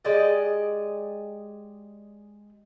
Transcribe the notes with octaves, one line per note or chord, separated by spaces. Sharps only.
G#3 G4 D5 D#5